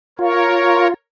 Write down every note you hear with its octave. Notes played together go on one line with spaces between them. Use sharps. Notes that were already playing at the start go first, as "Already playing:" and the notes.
F4 A#4 C#5